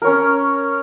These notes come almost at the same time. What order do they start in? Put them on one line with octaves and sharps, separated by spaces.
A#4 C#5 C#4